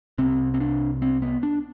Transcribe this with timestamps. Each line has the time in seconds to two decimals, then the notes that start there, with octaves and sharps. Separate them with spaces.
0.18 C2 C3 C4
0.54 C4
0.60 D4
1.02 C4
1.22 B3
1.43 D4